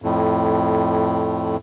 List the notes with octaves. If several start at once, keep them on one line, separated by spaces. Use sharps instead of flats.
F2 A2